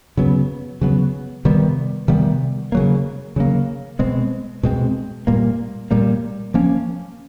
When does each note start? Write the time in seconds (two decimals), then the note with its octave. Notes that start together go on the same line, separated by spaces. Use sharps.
0.17 C#3 F#3 B3
0.81 C#3 F#3 B3
1.45 C3 D#3 G3 B3
2.08 C3 D#3 G3 B3
2.72 C#3 F#3 A#3
3.36 C#3 F#3 A#3
3.99 B2 G#3 C4
4.63 B2 G#3 C4
5.27 A#2 G3 A#3
5.91 A#2 G3 A#3
6.54 F3 A#3 C#4